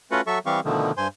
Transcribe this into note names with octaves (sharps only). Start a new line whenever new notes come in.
A3 C#4 F4 F#4 B4 F#5
F#3 A4 E5 C#6
E3 G3 C4 G4 F5 C#6
B2 D3 D#3 F3 A3
G2 C5 G#5 C6